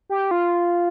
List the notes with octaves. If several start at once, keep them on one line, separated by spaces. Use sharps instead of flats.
G4
F4